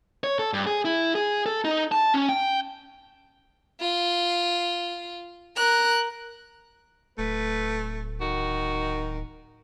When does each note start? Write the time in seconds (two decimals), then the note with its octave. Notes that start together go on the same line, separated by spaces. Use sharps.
0.24 C#5
0.39 A4
0.53 G2
0.67 G#4
0.85 E4
1.15 G#4
1.46 A4
1.65 D#4
1.92 A5
2.14 C#4
2.29 G5
3.81 F4
5.57 A#4 F#6
7.18 D1 A3 B4
8.21 D#3 F#4